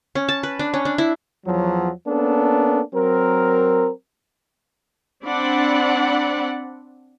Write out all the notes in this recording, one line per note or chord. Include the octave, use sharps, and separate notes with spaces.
C#4
A5
B4
D4
C#4
D4
E4
E2 F3 F#3
A#3 B3 C#4 D4 A4
F#3 C4 A#4
C4 D4 D5 F#5 B5